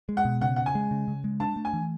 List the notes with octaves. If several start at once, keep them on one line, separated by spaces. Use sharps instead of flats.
G#3
F#5
B2
C#3 F#5
C#3 F#5
G#5
G#3
C#3
C#3
G#3
D4 A5
A3
G#5
E3